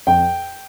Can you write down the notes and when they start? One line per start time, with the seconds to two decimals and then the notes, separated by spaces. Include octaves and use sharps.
0.07 F2 G5